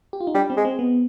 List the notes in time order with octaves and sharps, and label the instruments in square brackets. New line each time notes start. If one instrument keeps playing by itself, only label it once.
[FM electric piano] G4
F4
D#4
[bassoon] G3 [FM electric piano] D4
[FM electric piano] C4
[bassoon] G#3
[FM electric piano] C4
B3